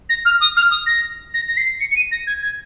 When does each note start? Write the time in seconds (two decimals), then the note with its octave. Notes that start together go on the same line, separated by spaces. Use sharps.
0.09 A#6
0.25 F6
0.40 D#6
0.56 F6
0.71 D#6
0.86 A#6
1.34 A#6
1.48 A#6
1.57 C7
1.80 C#7
1.90 C#7
1.96 D#7
2.11 A#6
2.27 G#6
2.42 G#6